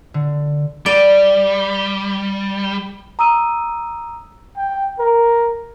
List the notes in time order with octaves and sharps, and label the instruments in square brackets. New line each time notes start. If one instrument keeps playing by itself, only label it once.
[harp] D3
[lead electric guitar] G3 [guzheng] D5
[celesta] A#5 D#6 E6 D#7
[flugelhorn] G5
A#4